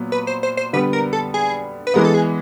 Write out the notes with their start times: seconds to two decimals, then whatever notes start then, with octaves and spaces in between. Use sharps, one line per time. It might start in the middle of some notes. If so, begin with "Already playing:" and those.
Already playing: A#2 F#3 B3
0.12 B4
0.27 C5
0.43 C5
0.57 C5
0.73 D3 G3 B3 B4
0.93 A#4
1.13 A4
1.34 G#4
1.87 B4
1.94 E3 G#3 B3 A#4
2.05 A4
2.14 G#4